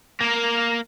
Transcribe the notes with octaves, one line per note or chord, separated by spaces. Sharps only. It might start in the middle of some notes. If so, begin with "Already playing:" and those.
A#3 A#4